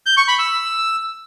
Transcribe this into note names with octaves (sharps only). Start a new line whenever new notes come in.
G6
C#6
B5
E6